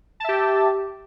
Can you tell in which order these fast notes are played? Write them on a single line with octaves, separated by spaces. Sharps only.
A5 E5 G4